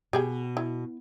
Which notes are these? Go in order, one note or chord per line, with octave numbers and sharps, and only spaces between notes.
B2 G4 G#4 G5
E4